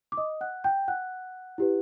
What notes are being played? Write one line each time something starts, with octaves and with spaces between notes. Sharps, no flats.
D6
D#5 D#6
F#5 F#6
G5 G6
F#5 F#6
E4 G4 B4